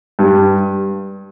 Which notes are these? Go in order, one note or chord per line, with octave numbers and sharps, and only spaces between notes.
G2